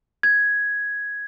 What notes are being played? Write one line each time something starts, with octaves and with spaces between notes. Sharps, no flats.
G#6